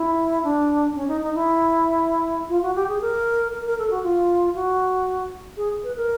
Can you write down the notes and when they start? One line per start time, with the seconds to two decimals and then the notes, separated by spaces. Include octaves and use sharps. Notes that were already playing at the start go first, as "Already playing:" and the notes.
Already playing: E4
0.44 D4
0.92 D4
0.95 C#4
1.08 D#4
1.21 D#4
1.35 E4
2.49 F4
2.62 F#4
2.75 G4
2.88 G#4
3.01 A#4
3.52 A#4
3.65 A#4
3.78 A4
3.90 F#4
4.03 F4
4.55 F#4
5.57 G#4
5.84 B4
5.96 A#4